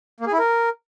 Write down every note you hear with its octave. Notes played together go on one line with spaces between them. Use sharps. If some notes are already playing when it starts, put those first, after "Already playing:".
A#3
G#4
E4
A#4